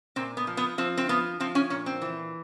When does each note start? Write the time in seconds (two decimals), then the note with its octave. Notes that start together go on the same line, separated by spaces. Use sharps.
0.16 A#2 C4
0.37 B3
0.47 F3
0.57 B3
0.78 F3 C4
0.97 C4
1.09 F3 B3
1.40 F3 C4
1.55 C#4
1.70 A#2 C#4
1.86 C4
2.02 E3